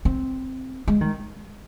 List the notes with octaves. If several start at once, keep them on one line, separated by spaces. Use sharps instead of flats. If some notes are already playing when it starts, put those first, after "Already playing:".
C4
G#3
D#3